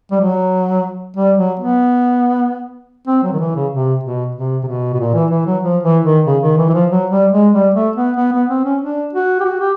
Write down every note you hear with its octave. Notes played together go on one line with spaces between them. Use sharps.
G3
F#3
G3
F#3
B3
C4
F#3
D#3
E3
C#3
C3
B2
C3
C3
B2
B2
A#2
E3
E3
F#3
F3
E3
D#3
C#3
D#3
E3
E3
F3
F#3
G3
G#3
G3
A3
B3
B3
B3
C4
C#4
D4
F#4
G4
F#4
G4